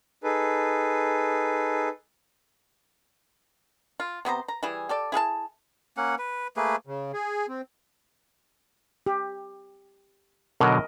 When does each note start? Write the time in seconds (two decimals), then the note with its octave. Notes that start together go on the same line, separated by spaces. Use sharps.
0.24 D#4 G#4 A4 B4
4.00 F4
4.25 C3 B3 C5 A#5
4.48 A#5
4.63 E3 G3 E4 G#4
4.89 G4 A4 D5
5.12 E4 G#4 F5 A5
5.97 A#3 C#4 F#5
6.18 B4
6.57 A3 A#3 G#4 B4
6.87 C#3
7.14 G#4
7.49 C4
9.06 G4
10.61 B2 D3 F#3 A#4 D#5